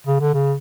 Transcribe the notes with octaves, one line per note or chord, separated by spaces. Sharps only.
C#3
D3
C#3